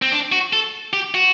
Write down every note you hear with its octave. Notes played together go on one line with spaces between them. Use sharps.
C4
D4
F#4
A4
G4
F#4